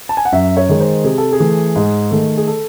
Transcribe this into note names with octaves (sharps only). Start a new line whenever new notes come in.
A5
G#5
F#5
F#2 E5
C#5
D#3 G#3
C5
C3 G#4
A4
G#4
E3 A3
G#2
D#3 A3
G#4
A4